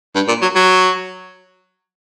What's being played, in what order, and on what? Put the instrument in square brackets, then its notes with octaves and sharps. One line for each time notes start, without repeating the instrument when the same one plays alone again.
[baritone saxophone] G2
A#2
F#3
F#3